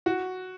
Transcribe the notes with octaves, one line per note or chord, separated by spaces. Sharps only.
F#4